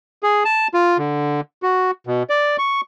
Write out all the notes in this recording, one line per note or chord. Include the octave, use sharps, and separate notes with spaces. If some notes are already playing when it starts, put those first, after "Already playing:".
G#4
A5
F4
D3
F#4
B2
D5
C#6